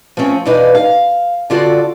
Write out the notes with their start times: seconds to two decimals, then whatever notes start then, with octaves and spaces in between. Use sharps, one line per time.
0.17 F3 A3 C4 C#4
0.45 E2 B2 D4 D#4 B4 F5
0.75 F5
1.50 D3 C4 F4 F#4 A4 D5